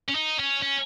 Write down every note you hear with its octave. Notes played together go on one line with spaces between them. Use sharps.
C#4
D#4
C#4
C#4